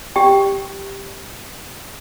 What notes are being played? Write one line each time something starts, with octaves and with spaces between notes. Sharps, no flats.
G4 G5